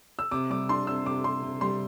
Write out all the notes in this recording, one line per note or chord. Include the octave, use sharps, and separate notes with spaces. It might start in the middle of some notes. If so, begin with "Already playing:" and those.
E6
C3 D6
G3 D6
D4 C6
C3 E6
C3 D6
C3 C6
C3
G3 C6